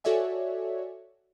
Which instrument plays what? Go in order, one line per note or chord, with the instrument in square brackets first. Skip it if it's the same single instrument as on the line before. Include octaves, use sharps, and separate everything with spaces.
[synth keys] F#4 A4 C#5 D5 E5 G#5